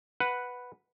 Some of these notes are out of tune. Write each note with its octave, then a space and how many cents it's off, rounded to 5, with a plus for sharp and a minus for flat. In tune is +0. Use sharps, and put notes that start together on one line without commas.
B4 +0 F#5 +0